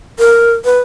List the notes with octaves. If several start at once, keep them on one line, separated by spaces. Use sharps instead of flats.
A#4
B4